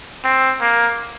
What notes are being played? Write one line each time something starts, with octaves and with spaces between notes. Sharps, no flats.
C4
A#3